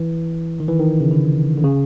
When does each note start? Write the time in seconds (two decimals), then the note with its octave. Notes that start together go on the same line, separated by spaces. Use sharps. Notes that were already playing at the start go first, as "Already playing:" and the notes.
Already playing: E3
0.60 D#3
0.68 E3
0.79 D#3
1.01 C#3
1.11 D3
1.58 D3
1.64 C#3